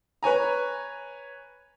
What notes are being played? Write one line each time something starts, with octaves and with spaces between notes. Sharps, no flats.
B4 C#5 G#5 A#5